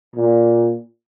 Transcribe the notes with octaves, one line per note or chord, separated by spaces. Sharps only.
A#2